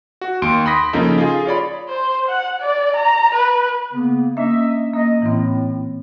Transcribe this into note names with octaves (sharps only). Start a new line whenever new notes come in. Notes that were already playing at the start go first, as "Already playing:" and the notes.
F#4
D#2 C6 D7
B5 C6 D#6 A#6 B6
C#3 F3 A#3 C#4 D#4 A4
F4 G#4
F4 C#5 D5 B5
C5
F#5
D5
A#5
B4
C#3 A#3 B3
A#3 C#4 D4 D#5 E5
A#3 D#5
A2 E3 C4